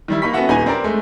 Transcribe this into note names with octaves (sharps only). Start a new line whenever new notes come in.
D#3 G3 E4
A#3 D#4 B5 C#6 B6
B3 C#4 F#4 A4 E5 F#5
D#1 D#4 B4 G#5
C4 D4 A#4 D5
G#3 A3